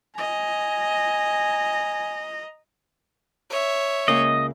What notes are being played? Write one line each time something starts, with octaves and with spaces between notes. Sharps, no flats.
D#5 G#5 A#5
C#5 E5
C#2 C#3 A#3 D#5